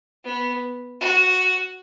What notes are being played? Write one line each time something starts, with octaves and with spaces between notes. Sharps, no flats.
B3
F#4